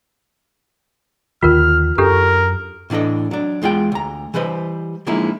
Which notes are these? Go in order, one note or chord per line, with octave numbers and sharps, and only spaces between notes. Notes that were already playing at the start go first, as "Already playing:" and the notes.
D#2 D3 D#3 F4 A#4 F6
F#2 D4 G4 A4 A#4
A2 E3 D4 A4 D#5
F#3 D4
E2 G#3 F4 F#5 G5
D2 A#5
E3 G3 B4 C5 D#5
D3 F3 G#3 A#3 D#4 E4